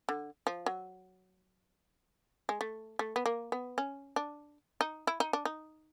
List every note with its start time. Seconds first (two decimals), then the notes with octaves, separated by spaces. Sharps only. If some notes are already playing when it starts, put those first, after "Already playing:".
0.09 D3
0.47 F3
0.66 F#3
2.49 G#3
2.61 A3
2.99 A3
3.16 B3
3.26 A#3
3.52 B3
3.78 C#4
4.16 D4
4.81 D#4
5.07 E4
5.20 D#4
5.33 D4
5.45 D#4